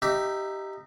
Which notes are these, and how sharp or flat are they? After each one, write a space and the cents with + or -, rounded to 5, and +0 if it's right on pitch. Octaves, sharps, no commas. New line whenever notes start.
D#4 -10 G4 -10 E5 +10